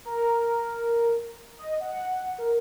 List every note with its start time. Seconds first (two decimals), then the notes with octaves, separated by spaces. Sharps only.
0.05 A#4
1.59 D#5
1.80 F#5
2.38 A#4